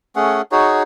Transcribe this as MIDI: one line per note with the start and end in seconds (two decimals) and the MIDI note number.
0.16 0.42 57
0.16 0.42 61
0.16 0.42 68
0.16 0.42 78
0.52 0.83 63
0.52 0.83 66
0.52 0.83 68
0.52 0.83 73